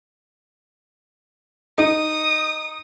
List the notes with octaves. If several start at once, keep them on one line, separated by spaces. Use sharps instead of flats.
D#4 D#6